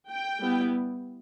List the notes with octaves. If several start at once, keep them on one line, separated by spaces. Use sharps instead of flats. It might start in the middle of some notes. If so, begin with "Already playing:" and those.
G5
G3 B3 E4